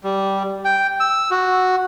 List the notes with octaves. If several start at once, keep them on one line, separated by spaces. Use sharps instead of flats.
G3
G5
E6
F#4